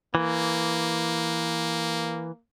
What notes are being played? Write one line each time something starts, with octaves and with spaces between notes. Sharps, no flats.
E3 A#3